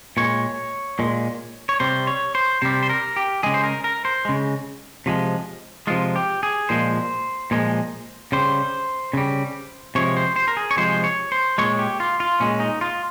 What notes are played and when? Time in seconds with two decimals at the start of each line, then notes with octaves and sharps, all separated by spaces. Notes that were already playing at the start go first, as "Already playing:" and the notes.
0.17 A#2 G#3 C#5
0.99 A#2 G#3
1.69 C#5
1.80 C3 G3 C5
2.07 C#5
2.35 C5
2.62 C3 G3 C5
2.83 C5
2.90 A#4
3.16 G4
3.43 C#3 G#3 G#4
3.54 C5
3.64 A#4
3.84 A#4
4.05 C5
4.25 C#3 G#3
5.06 C3 F3 G#3
5.87 C3 F3 G#3 F4
6.16 G4
6.43 G#4
6.69 A#2 F3 G#3 C5
7.51 A#2 F3 G#3
8.32 C#3 G3 C5
9.13 C#3 G3
9.95 C3 F3 G#3 C#5
10.17 C5
10.36 C5
10.48 A#4
10.57 G#4
10.71 C#5
10.77 C3 F3 G#3 C5
11.04 C#5
11.32 C5
11.58 A#2 G#3 C#5
11.79 G4
12.00 F4
12.20 F4
12.40 A#2 G#3 C#4
12.60 D#4
12.81 F4